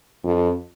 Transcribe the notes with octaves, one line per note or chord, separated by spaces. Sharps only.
F2